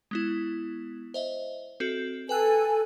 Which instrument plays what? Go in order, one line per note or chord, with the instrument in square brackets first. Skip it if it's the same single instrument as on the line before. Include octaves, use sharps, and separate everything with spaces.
[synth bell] G#3 B3 E4
C5 D#5 E5
C4 F#4 A4
[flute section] A4 G#5 [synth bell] B4 G5 F#6